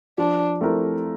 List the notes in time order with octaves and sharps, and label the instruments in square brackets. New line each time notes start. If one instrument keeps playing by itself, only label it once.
[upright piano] F3 [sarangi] D4
[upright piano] A3 C4 E4 A#4